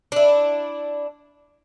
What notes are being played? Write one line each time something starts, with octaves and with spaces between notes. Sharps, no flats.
D4 E4